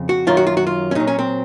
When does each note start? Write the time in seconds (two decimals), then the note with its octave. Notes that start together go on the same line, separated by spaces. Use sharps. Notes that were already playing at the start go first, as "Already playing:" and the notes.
Already playing: F2 C#3
0.09 F#4
0.27 F#2 D#3 F#3 F4
0.37 F#4
0.47 F4
0.57 F#4
0.67 F4
0.91 C#4
0.95 A#2 F#3 D#4
1.07 C#4
1.19 C4